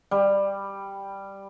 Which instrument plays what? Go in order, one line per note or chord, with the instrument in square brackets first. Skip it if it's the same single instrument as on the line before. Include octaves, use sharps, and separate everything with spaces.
[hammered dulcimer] G3